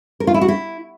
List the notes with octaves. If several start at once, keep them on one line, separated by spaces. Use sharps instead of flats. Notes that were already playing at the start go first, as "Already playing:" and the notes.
A#4
F4
E4
F#4
E4